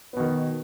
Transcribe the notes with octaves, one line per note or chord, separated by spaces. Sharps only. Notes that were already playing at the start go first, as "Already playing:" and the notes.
B2 D#3 B3